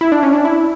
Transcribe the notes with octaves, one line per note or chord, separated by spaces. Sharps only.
E4
D4
C#4
D4
E4